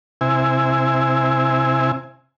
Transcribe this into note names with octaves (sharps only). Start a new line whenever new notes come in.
C3 E4 G#5